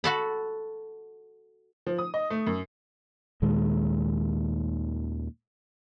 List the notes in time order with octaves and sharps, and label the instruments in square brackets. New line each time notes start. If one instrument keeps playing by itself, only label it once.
[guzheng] F#4 A4 B5
[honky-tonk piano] F3
D#6
D#5
A3
F#2
[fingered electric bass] D#2 A#2 D#3 G#3